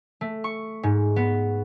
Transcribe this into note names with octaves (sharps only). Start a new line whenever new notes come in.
A3
C#6
G#2
B3